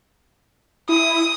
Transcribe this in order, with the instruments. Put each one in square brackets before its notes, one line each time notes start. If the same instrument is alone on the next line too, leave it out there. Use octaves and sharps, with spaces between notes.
[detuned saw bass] E4 [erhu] D#6